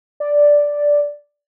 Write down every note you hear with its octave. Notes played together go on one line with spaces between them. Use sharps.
D5